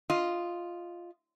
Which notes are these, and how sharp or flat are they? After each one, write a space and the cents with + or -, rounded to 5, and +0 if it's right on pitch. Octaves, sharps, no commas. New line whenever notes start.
F4 +0 D#5 +0